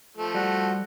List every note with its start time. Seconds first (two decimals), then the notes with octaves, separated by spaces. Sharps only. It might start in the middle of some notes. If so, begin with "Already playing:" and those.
0.17 F3 A3
0.35 G3 F#4